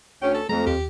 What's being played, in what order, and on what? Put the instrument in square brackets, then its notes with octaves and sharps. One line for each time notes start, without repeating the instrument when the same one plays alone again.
[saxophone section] D2 C#4 [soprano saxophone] G5
[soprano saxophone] A4
[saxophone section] F2 [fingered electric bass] G#3 A3 [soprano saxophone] A#5
[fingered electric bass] D#2 [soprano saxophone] G4